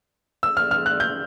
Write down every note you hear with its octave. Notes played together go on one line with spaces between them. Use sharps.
E6
F6
F6
F#6
G6